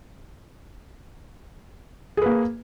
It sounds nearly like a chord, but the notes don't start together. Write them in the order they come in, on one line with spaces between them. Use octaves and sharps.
G#4 B4 A#3